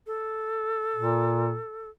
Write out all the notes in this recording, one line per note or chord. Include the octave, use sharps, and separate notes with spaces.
A4
A#2